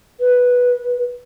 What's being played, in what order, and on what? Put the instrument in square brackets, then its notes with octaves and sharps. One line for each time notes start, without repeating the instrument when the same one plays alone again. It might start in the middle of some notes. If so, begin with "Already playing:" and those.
[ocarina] B4